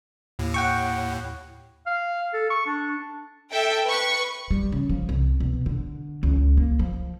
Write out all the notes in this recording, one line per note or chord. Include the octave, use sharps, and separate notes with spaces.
D#2 A2
F#5 G5 C#6
F5
A4
C#6
D4
A4 E5 G5
B4 C#6
G3
C#3
F3
C2
B2
D3
C#2
A#3
F3